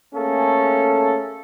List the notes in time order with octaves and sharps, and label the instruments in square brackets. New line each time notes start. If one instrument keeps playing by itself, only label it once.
[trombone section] A3 A#3 C#4 G#4 A4